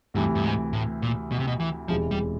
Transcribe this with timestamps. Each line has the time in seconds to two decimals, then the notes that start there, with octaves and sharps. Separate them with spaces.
0.14 D2 G2 C3 E3
0.35 G2
0.44 G#2
0.73 A2
1.02 A#2
1.31 B2
1.39 C3
1.47 B2
1.60 E3
1.88 E1 E2 C3 E3 F3 G#3
2.11 G3